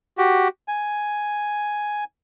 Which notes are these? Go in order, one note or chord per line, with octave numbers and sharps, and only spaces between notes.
F#4 G4
G#5